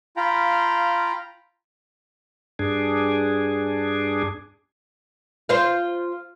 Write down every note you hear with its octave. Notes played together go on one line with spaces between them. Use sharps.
F4 F5 G5 A#5 B5
G2 D4 G#4
F4 C5 F5